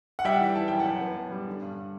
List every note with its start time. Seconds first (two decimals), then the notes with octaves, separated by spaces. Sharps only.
0.19 F#5
0.25 G3 E5 G5
0.40 E3
0.55 E3 A5
0.68 F#2 G5
0.79 F#5 A5
0.86 F#2
1.01 B3
1.17 F#2
1.32 G3
1.47 D3
1.62 G2